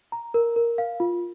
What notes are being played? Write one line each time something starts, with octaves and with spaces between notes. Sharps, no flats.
A#5
A#4
A#4
F5
F4